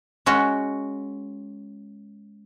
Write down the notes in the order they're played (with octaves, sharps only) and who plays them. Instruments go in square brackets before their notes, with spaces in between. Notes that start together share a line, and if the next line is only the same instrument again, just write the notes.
[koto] G#3 C#4 F#4